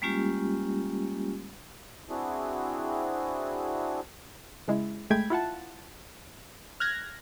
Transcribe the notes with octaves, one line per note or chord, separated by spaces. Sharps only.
G3 G#3 A#3 C#4 F4 G4
C4 D4 E4 F#4 G#4
C#3 G#3 E4
G#1 G#3 A3 G5 B5 G#6
E4 F4 F#5 A5
F6 F#6 G#6 A#6